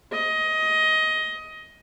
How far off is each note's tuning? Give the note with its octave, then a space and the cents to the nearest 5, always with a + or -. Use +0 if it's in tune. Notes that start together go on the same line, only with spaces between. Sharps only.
D#5 +20